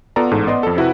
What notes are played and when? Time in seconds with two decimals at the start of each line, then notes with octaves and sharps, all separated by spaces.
0.16 B3 F4 A4 D5 A#5
0.31 A1 G#2 A4
0.47 B3 D5 D#5 C6
0.63 F2 A4
0.77 C3 E4 F#4 B4